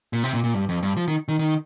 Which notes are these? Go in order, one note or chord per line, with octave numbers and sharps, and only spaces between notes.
A#2
C3
A#2
A#2
G2
F2
G2
F3
D#3
D#3
D#3